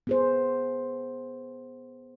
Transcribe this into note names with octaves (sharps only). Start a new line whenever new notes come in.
B3 G#4 C5